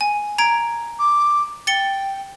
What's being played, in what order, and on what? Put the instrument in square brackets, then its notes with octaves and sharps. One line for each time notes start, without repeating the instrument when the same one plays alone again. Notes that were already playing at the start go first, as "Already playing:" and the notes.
[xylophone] G#5
A#5 G#6 D7
[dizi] D6
[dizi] G5 [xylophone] A6 C#7 G7